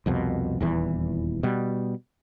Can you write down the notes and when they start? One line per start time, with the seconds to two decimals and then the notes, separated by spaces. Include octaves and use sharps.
0.06 C2 F2 B2
0.61 D#1 E2 E3
1.43 B2 G3